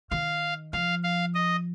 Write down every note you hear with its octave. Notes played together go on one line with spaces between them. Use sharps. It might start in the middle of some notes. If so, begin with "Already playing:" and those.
D#3 F5
F3 F5
F5
D#5